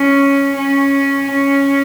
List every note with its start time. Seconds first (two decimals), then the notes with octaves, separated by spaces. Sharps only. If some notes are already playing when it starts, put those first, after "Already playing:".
Already playing: C#4
0.56 C#4
1.31 C#4